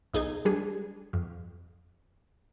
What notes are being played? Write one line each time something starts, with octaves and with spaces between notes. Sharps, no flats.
B1 D#4 G#4 G#6
G3 D4 G#4
F2